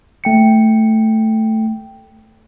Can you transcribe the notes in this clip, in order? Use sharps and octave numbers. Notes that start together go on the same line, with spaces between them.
A3 G5 C#7